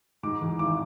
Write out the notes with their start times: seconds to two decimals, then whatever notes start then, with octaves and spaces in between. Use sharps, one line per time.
0.23 G#2 D6
0.41 E3
0.59 G#1 D6